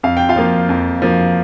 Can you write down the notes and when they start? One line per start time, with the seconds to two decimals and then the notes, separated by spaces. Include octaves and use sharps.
0.03 F2 F5
0.17 G5
0.29 F4 F5
0.36 F3 A#3
0.69 F2
1.02 F3 A#3